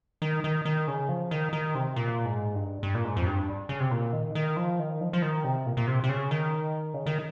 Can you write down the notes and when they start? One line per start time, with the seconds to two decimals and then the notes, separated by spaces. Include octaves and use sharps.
0.22 D#3
0.44 D#3
0.65 D#3
0.88 C#3
1.09 F3
1.31 D#3
1.53 D#3
1.75 C3
1.96 A#2
2.25 G#2
2.55 G2
2.83 G2
2.95 A#2
3.05 G#2
3.16 F2
3.27 G2
3.69 C#3
3.80 C3
3.91 A#2
4.13 D#3
4.35 D#3
4.57 F3
4.79 D#3
5.01 F3
5.13 F3
5.22 D#3
5.44 C3
5.66 A#2
5.77 A#2
5.87 C3
6.04 C3
6.09 C#3
6.31 D#3
6.94 C#3
7.06 D#3